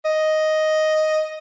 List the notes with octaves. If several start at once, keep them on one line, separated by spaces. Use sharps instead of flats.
D#5